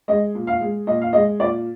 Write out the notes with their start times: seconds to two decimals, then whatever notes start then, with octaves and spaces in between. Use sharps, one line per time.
0.08 G#3 D#5
0.35 A#2
0.47 F5
0.60 G#3
0.87 A#2 D#5
1.01 F5
1.13 G#3 D#5
1.39 A#2 D5